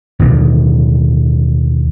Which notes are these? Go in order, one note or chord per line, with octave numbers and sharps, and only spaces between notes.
D#2 B2 D3